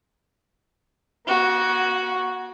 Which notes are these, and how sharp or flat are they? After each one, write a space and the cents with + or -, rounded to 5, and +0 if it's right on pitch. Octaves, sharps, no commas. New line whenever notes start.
A#3 +40 F#4 +0